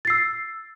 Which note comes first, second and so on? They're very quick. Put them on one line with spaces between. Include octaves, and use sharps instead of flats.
A6 C7 E6